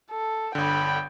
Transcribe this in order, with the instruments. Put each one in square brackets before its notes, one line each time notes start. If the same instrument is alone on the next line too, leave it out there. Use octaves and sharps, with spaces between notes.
[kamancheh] A4
[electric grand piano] G1 D3 [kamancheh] G5 B5